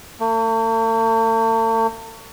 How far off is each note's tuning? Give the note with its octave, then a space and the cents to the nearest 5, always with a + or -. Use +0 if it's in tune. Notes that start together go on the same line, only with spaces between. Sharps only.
A3 +45